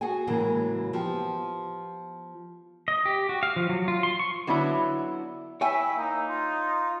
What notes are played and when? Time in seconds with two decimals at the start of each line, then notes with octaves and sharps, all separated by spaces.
0.01 F#4 G#4 A4 F#5 G#5
0.27 A2 C#3 E3 F#3 G#3 A#3
0.93 F3 B3 F4 G4
2.88 D#5
3.05 G4
3.29 F#4
3.43 F5
3.56 F3
3.69 F#3
3.88 F4
4.03 C6
4.19 C#6
4.47 D3 F#3 B3 D4 E4
5.61 E4 C#5 E5 G5 G#5
5.96 A#3 D#4
6.29 F4